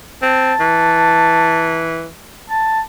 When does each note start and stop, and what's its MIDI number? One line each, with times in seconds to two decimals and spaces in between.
0.22 0.54 60
0.22 1.87 81
0.60 2.08 52
2.50 2.80 81